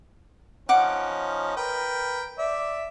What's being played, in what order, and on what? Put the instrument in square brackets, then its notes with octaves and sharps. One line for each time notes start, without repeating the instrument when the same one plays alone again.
[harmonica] F3 C#4 D#4 [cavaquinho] F#5 D6
[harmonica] A#4 B4 G5
D5 E5